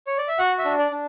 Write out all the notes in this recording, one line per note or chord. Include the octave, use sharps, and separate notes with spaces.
C#5
D5
E5
F#4 F#5
E5
D4
D5
D4